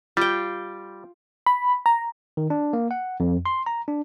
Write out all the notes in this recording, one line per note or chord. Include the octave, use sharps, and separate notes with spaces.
G3 F4 G5
B5
A#5
D#3
D4
A#3
F#5
F2
C6
A#5
D4